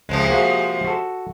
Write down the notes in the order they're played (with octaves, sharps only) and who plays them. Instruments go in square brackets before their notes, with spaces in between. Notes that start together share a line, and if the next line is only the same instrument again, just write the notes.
[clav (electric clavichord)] C#2 [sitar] C3 F3 G#3
[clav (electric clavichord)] A#3 F#4 G#4
F#4 A4